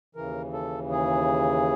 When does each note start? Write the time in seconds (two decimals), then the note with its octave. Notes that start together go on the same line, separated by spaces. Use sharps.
0.15 D#2 C#3 E3 A#4
0.53 A4
0.91 G#4